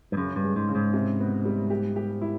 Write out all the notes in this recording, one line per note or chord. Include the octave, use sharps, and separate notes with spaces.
G2
F#2 C#3
G2
G#3
G#2
C#3
G#2
C3
B3
G3
G4
G4
E4